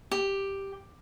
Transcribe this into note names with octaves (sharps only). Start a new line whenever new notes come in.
G4